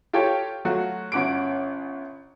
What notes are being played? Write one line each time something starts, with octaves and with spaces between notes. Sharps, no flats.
F4 G4 A4 C#5 G5
F#3 A3 F4 F#4
G1 C#4 F#5 D6 D7